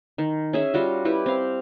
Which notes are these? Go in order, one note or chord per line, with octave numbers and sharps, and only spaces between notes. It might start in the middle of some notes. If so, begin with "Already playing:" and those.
D#3
C#4 G#4 E5
G3 F4 F#4
E4 G4 B4
C4 F5